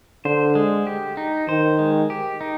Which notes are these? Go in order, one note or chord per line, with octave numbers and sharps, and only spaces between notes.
D3 C5
G#3
G4
D#4
D#3 C5
G#3
G4
D#4